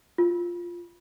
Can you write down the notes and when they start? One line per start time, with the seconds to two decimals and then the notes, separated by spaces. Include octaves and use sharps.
0.18 F4